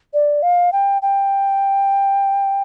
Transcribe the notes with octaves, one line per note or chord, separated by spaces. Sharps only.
D5
F5
G5
G5